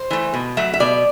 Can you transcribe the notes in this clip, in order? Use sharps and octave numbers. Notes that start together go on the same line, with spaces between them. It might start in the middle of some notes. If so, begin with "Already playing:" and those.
Already playing: C5
E3 A3
B2
F#3 A3 E5
E5
B2 D5